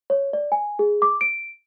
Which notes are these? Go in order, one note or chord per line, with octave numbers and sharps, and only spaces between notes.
C#5
D5
G#5
G#4
D6
D7